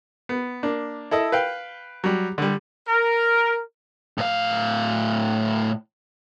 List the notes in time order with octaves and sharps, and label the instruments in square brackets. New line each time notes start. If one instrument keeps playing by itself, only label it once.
[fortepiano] B3
A#3 D4
E4 A4 D#5 E6
B4 F5 G5
F#3 G3
D3 G3
[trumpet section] A#4
[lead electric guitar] A2 F5